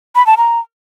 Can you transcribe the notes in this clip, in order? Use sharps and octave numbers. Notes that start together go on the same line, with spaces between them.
B5
A5
A#5